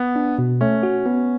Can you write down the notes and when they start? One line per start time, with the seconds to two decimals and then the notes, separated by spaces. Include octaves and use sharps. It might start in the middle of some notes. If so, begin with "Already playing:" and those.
Already playing: B3
0.16 D4
0.38 B2
0.61 A3 C#4
0.83 F#4
1.06 B3